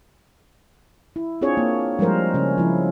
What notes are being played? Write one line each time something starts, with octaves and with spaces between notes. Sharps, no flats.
E4
C4 D4 F4 G#4 C#5
A#3
F3 G3 G#3 A#4 C5
C#3 C#4
F3 E4